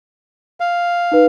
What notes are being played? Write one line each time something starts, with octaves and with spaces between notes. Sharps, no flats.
F5
D#4 B4